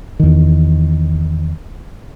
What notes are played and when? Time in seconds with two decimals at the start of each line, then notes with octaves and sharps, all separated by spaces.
0.19 E2 D#3